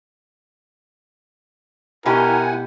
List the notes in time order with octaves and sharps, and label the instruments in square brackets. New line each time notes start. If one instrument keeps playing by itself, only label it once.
[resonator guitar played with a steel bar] B2 G4 [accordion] E4 F#5 G#5 [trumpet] A#4